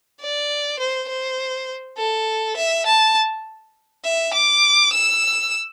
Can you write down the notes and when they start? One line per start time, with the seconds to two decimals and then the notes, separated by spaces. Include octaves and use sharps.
0.21 D5
0.79 C5
1.09 C5
1.98 A4
2.56 E5
2.86 A5
4.04 E5
4.33 D6
4.92 E6